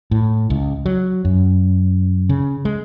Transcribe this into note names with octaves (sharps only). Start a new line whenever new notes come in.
A2
C#2
F#3
F#2
C#3
G#3